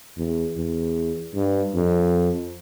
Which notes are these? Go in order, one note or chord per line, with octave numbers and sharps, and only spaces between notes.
E2
E2
G2
F2